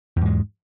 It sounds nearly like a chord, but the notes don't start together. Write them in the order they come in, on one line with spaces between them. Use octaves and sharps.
E2 G#2 G#3